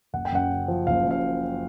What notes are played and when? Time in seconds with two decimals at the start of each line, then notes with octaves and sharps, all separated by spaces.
0.13 F#1 F#5
0.25 G5
0.32 F#2 F#5
0.51 C#3
0.68 F3
0.87 F#1 F5
1.05 F#2
1.11 F5